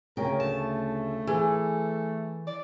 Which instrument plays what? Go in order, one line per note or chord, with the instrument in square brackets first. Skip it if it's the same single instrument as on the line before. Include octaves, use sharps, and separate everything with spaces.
[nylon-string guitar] D2 C#3 G5 [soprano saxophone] A#4
[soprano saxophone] A3 [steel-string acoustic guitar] A5
[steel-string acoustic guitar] E3 [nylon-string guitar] G#4
[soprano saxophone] D5